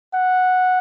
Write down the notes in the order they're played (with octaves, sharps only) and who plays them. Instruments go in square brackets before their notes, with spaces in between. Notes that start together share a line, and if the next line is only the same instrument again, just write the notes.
[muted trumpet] F#5